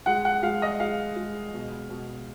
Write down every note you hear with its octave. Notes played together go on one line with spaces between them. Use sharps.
G#3 F#5
F#5
G#3 F5
D#5
G#3 F5
G#3
B2
B2